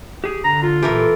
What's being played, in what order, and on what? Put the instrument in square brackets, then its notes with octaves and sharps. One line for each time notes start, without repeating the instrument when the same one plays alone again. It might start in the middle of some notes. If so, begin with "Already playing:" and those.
[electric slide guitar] G4 G#4
[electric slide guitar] D3 [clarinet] A#5
[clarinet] F4
[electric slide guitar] A#2 G4 [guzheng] E3 A4 A#4